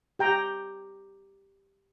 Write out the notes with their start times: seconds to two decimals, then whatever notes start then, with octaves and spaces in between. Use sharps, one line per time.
0.19 G4 G5 A#5